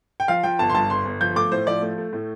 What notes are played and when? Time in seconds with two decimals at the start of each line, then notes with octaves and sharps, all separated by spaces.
0.20 G5
0.28 F3 F5
0.43 F3 G5
0.59 G1 A5
0.70 C6
0.74 G2 A5
0.90 G1 C6
1.05 G1
1.21 F3 G6
1.36 A3 D6
1.52 A2 C5
1.67 F3 D5
1.82 A3
1.98 A3
2.13 A2